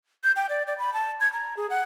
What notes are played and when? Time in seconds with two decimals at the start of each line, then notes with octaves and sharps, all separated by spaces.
0.24 G6
0.36 G5
0.49 D5
0.67 D5
0.78 B5
0.94 A5
1.20 G#6
1.33 A#5
1.57 G#4
1.70 F#5